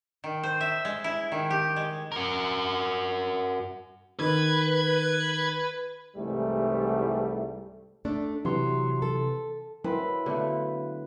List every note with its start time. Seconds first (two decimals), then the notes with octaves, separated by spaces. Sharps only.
0.24 D#3
0.43 C5
0.61 E5
0.85 G#3
1.04 E4
1.32 D#3
1.50 G4
1.76 G#3
2.12 F#4 A#4
4.19 D#3 B4 G#6
6.16 C2 G#2 E3 G3 A3
8.05 A3 D4
8.45 C3 E3 F#3 C6
9.02 A4
9.84 F#3 C4 E4 B4
10.26 D3 A3 B3 F#4